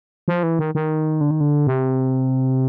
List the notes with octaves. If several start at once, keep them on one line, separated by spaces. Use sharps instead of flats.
F3
E3
D#3
D#3
D3
D#3
D3
C3